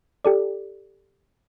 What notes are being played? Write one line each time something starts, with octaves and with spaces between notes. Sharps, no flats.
G4 A4 D5